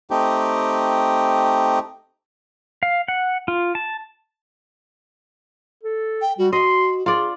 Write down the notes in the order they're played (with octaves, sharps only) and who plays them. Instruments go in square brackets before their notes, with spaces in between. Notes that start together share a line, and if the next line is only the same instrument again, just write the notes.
[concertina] A3 C4 D#4 G4
[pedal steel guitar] F5
F#5
F4
A5
[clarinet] A4
[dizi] G5
[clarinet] G3 [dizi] F#4
[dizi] F#4 [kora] D#5 [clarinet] C6
[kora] F4 D5 [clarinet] G#4